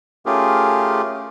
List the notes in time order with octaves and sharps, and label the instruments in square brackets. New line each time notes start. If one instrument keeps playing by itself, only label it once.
[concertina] A3 C#4 F4 G4 G#4 A#4